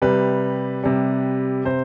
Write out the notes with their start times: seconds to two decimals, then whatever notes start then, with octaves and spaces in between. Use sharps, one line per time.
0.02 C3 G3 B4
0.83 C3 G3
1.65 C3 C5